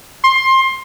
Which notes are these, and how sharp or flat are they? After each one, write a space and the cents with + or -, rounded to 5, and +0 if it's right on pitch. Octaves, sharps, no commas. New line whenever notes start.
C6 +20